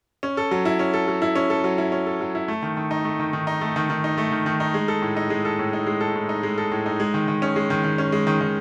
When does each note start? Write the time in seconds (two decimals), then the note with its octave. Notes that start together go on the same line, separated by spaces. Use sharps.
0.23 C#4
0.37 A4
0.51 F#3
0.65 E4
0.79 C#4
0.94 A4
1.08 F#3
1.22 E4
1.36 C#4
1.50 A4
1.64 F#3
1.78 E4
1.92 C#4
2.07 A4
2.21 F#3
2.35 E4
2.48 A3
2.62 D#3
2.77 D#3
2.91 D#4
3.05 A3
3.19 D#3
3.33 D#3
3.47 D#4
3.61 A3
3.76 D#3
3.90 D#3
4.04 D#4
4.18 A3
4.32 D#3
4.46 D#3
4.60 D#4
4.74 G#3
4.88 A4
5.02 A2
5.17 D#4
5.30 G#3
5.45 A4
5.59 A2
5.73 D#4
5.87 G#3
6.01 A4
6.15 A2
6.29 D#4
6.43 G#3
6.58 A4
6.71 A2
6.86 D#4
7.00 G#3
7.14 D#3
7.28 D#3
7.42 C#4
7.56 G#3
7.70 D#3
7.84 D#3
7.98 C#4
8.12 G#3
8.27 D#3
8.41 D#3